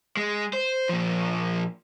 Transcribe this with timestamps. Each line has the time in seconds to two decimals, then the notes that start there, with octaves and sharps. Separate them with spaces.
0.17 G#3
0.53 C5
0.89 A#2 F3